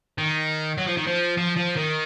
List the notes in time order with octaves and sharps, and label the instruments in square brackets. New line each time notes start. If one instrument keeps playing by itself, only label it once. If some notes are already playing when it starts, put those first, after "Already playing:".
[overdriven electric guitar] D#3
F#3
F3
D#3
F3
F3
F3
D#3